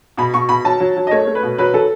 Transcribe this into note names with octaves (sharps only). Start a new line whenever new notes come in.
B2 B5
B2 C#6
B2 B5
F#3 A5
F#3
F#3
D#5
A3 C#5
A3
B4
B2
F#3 B4
F#3 A4